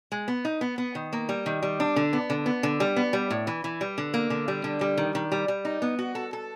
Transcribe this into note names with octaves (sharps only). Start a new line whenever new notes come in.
G#3
B3
D#4
B3
B3
D#3
A#3
G3
D#3
G3
D4
D3
B3
D3
B3
D3
G3
B3
G3
A2
E3
E3
G3
D3
A#3
D3
G3
D3
G3
D#3
D#3
G3
G3
D#4
B3
F#4
A4
A4